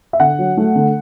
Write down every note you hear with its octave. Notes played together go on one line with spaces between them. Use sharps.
E5
D3 F#5
F#3
A3
D3